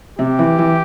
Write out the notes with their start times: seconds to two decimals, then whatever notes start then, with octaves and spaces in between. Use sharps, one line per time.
0.19 C3 G4
0.39 E3
0.59 E3